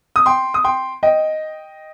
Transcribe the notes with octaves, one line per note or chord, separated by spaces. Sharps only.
D#6
G5 C6
D#6
G5 C6
D#5 G5